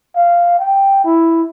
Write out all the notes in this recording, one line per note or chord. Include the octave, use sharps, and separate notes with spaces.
F5
G5
E4